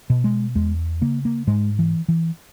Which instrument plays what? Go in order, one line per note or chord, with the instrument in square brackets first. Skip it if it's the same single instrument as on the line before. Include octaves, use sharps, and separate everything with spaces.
[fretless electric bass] B2
G#3
E2 G#3
C#3 A#3
A#3
G#2 G#3
E3
E3